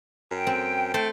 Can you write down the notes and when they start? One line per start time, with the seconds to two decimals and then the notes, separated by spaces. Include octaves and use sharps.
0.31 F#2 G5
0.47 C4
0.94 A3 C5